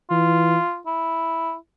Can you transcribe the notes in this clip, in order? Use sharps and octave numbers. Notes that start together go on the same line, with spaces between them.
E3 F4
E4